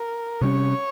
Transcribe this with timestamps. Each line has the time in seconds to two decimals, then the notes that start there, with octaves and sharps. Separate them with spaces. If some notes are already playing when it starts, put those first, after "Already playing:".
Already playing: A#4
0.41 C3 G3 C#4 C#5